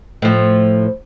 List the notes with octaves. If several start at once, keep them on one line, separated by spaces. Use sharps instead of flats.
A2 F3